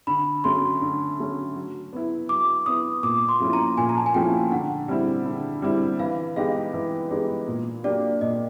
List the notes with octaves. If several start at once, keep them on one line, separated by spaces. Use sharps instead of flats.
D3 B5
F#3 A3 C#4 C6
D3
F#3 A3 C#4
F#3
B3 E4
F#3 D6
B3 E4 D#6
A#2 D6
C6
F3 A3 C#4 E4
A#5
A#2 G#5
A#5
A5
G#5
F3 A3 C#4 E4 G5
D3 F#5
G3 C4 E4
D3
G3 C4 E4
E3 F5
G#3 B3 D#4 G4 F5
E3
G#3 B3 D#4 G4
A#2
F#3 A#3 D4 G4 D5
A#2 D#5